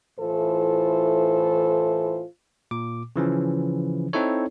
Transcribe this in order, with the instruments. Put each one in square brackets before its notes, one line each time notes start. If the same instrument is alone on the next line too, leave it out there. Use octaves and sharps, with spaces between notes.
[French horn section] A2 E3 F4 A4 C5
[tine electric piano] A#2 D6
C#3 E3 F3 C#4
C4 D#4 E4 A4 C#5